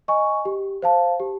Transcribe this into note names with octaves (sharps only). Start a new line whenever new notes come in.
D#5 G#5 C#6
G4
C5 F5 A5
G4